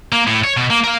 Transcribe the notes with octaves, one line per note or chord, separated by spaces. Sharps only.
A#3
A2
C#5
B2
A#3
A#4 F5